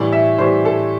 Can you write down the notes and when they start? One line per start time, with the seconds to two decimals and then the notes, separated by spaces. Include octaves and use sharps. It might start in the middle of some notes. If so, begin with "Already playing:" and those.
Already playing: A2 E3 G3
0.12 E5
0.38 A2 E3 G3 C5
0.65 A4